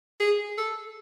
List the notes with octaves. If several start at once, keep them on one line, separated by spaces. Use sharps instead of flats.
G#4
A4